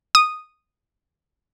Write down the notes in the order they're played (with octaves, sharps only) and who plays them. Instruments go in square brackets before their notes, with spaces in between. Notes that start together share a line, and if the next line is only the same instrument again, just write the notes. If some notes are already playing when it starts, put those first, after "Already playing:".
[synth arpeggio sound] D#6